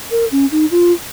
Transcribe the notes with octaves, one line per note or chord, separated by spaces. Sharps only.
A#4
C#4
D#4
F4